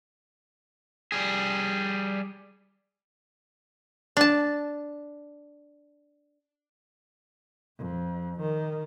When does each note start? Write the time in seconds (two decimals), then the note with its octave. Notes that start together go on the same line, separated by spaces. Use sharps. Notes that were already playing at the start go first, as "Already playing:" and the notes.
1.12 G3 G#4
4.17 D4 A5
7.78 F2
8.40 D#3